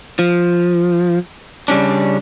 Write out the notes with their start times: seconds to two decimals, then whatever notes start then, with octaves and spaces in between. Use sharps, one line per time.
0.19 F3
1.68 C#3 G3 C#4 D4